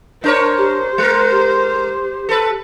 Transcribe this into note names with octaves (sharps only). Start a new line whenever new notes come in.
D4 A#4 C5 C#5
G4
G#3 A#4 F#6
G4
A4 B4